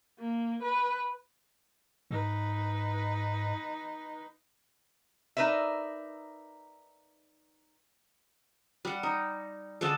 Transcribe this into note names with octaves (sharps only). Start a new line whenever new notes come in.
A#3
B4
G#2 D#4 B4
D#4 A#4 B4 D5 E5
G3 F#5
D#4
D3 G#3 D4 A4